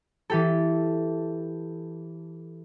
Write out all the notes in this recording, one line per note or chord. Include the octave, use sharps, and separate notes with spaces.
E3 G4 A4